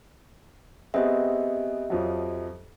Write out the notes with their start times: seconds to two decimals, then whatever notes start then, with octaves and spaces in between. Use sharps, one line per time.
0.94 B3 C4 G4 G#4 D#5 E5
1.90 F2 F3 F#3